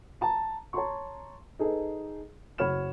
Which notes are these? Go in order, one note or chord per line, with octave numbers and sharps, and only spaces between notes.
A5 A#5
C#5 A5 A#5 C6 C#6
D#4 G#4 A4 B4 D#5
F#1 F#4 C#5 B5 F6 E7